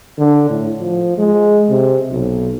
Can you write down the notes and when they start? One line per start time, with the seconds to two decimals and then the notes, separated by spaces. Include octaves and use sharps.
0.18 D3
0.49 A2
0.80 F3
1.18 G#3
1.70 C3
2.11 B1